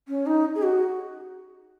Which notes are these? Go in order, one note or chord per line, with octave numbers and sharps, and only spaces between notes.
C#4
D#4
G#4
F#4